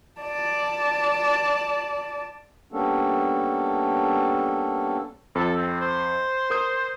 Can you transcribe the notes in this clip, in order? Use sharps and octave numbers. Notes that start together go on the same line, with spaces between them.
D5 A5
G3 A#3 B3 C#4 D4 A4
F2 A4
C4
C5
A#4 D#6 G6